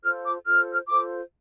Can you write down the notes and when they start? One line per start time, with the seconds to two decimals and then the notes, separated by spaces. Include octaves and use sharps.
0.03 F4 A4 C5 F6
0.25 D6
0.46 F4 A4 C5 F6
0.73 F6
0.87 F4 A4 C5 D6